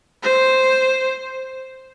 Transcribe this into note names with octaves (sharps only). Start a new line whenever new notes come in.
C5